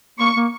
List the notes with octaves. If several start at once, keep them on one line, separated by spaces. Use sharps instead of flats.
A#3 C#6
A#3